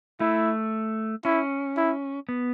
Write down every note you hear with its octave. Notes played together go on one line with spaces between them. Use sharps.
A3 E4
C#4 E4
E4
B3